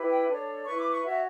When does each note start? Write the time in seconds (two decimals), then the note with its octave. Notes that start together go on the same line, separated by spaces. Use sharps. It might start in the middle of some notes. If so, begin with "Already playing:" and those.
Already playing: E4 G4 B4
0.09 G5
0.27 D4 A4 C#5
0.66 E4 B4 C#6
0.79 D6
0.91 C#6
1.04 F#4 C#5 E5